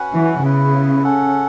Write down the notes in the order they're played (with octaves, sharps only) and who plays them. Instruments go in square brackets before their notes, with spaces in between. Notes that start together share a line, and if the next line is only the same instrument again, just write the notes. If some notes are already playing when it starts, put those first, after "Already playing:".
Already playing: [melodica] C#4 F#4 B4 F#5
[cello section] E3
[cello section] C#3 [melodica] B3 E4 B4
[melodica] C#4 A4 F#5